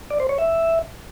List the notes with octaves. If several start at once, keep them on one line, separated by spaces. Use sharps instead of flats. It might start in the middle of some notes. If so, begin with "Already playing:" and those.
D5
C5
C#5
E5